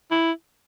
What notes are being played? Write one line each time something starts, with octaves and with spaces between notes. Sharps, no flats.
E4